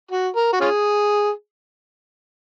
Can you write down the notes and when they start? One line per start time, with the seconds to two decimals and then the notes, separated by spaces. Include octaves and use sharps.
0.11 F#4
0.36 A#4
0.53 F#4
0.61 C#4 F4 G#4